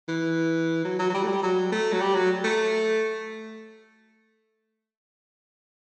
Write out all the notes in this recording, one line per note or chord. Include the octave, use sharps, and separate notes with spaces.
E3
F#3
F#3
F#3
G3
A3
G3
F#3
A3
F#3
G3
F#3
A3